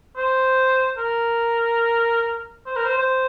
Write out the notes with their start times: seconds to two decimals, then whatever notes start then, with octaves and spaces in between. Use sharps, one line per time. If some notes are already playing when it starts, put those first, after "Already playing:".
0.17 C5
0.97 A#4
2.66 C5
2.76 A#4
2.85 C5
2.98 C5